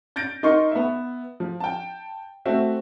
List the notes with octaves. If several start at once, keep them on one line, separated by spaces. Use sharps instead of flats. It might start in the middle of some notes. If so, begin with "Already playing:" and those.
G6 A6 A#6 D7
D#4 A#4 D#5 C6 C#6
B3 E5
F3
G5 A5
A3 C4 F#4 E5